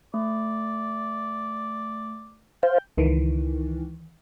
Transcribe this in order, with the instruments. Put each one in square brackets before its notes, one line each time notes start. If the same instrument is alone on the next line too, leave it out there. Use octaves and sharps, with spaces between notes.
[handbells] A3 [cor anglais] D5
[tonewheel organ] C5 F5 [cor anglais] G5
[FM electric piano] C#2 D#3 E3